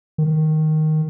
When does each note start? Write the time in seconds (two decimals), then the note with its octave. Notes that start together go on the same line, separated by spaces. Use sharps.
0.18 D#3